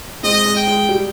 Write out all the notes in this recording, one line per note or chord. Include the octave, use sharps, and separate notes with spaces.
G#3 C4 D#5
G#3
G5
G#3
G3